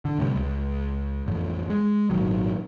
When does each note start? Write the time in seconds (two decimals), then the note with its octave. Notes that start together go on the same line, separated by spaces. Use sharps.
0.05 D3
0.19 A2 C3 G3
0.35 C#2
1.26 A1 F2
1.70 G#3
2.10 G#1 A#2 D#3 F#3